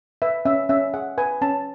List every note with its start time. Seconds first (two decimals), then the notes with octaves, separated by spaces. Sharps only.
0.22 B4 E5
0.45 C#4 E5
0.69 C#4 E5
0.94 G#4 F#5
1.18 B4 G#5
1.41 C#4 A5